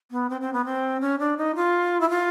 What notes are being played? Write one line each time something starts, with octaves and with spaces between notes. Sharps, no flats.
B3
C4
C4
B3
C4
C#4
D4
D#4
F4
E4
F4